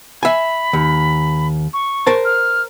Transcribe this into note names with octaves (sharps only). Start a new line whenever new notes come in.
E5 G#5 B5
D#2
C#6
A#4 C5 A5
F6